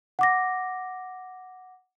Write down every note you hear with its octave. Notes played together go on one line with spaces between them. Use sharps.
F#5 D6 A#6